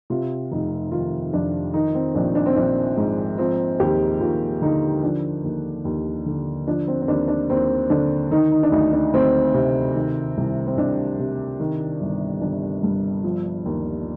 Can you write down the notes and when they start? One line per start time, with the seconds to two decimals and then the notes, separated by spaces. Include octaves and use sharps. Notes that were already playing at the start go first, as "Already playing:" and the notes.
0.10 C3 F4
0.51 F1 D#4
0.92 D#3 F4
1.33 F2 D4
1.74 D#3 D#4
1.94 C4
2.15 A#1 D4
2.35 D4
2.46 C4
2.56 A#1 D4
2.97 G#2
3.38 F3 C4
3.79 D#2 G4
4.20 D#2 F4
4.62 D3 D#4
5.03 F3 D4
5.44 D#2
5.85 D#2
6.26 D3
6.67 F3 D4
6.88 C4
7.02 C4
7.08 D#2 D4
7.28 D4
7.49 D#2 C4
7.90 D3 D4
8.31 D#3 D#4
8.52 D#4
8.63 D4
8.72 D2 D#4
8.93 D4
9.13 D2 C4
9.54 C3
9.95 D#3
10.37 C2
10.67 C4
10.77 C2 D4
11.19 C3
11.60 D#3
12.01 G1
12.41 G1 D4
12.83 G2
13.24 F3
13.65 D#2